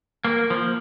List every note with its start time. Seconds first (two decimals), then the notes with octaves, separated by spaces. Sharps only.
0.25 A#3
0.50 F3